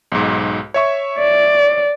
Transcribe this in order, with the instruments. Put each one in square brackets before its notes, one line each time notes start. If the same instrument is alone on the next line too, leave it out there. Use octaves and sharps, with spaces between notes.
[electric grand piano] B1 G#2
C#5 E5 C#6
[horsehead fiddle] D5